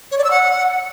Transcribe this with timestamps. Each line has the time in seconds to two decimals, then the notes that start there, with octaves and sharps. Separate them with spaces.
0.12 C#5
0.18 D5
0.24 E6
0.31 F#5